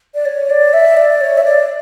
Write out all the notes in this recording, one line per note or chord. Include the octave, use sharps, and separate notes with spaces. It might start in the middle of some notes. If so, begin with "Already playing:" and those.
D5
C#5
D5
E5
D5
C#5
E5
D5